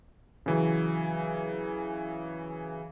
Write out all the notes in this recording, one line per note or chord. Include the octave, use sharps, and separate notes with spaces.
C#3 E3 F#3